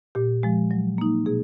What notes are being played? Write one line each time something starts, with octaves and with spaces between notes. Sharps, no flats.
A#2 G4
F3 G#3
F#3
A#3 D#4
B2 G#4